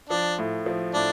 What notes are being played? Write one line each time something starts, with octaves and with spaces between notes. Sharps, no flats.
F3 D4
A2
F3
A2 D4